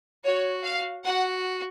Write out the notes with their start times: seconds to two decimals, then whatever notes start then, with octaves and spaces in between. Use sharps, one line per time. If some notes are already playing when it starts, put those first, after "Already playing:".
0.24 F#4 C#5
0.64 F5
1.04 F#4 F#5